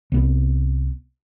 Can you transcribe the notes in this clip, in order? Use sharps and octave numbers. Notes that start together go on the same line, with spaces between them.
C2 B3